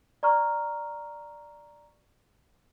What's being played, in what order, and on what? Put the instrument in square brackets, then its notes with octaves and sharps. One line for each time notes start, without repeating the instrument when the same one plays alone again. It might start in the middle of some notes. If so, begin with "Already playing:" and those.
[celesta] D5 A#5 C#6 F6